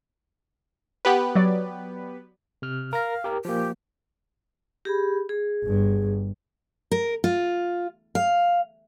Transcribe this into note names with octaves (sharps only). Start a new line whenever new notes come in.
B3 G4 B4
F#3 C#5 D5
C3 F6
A#4 F5 A#6
G4 A#4
F3 A#3 G4
G4 G#4 B5
G#4
G1 G2
A#4
F4
F5